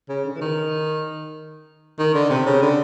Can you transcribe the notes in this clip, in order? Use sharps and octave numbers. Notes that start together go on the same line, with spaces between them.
C#3
D3
E3
D#3
D#3
D3
C3
C#3
D3